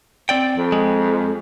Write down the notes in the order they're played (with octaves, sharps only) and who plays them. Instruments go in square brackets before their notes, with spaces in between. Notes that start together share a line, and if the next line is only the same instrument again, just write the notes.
[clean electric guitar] C4 D5 G5
[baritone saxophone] F2
[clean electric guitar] G#3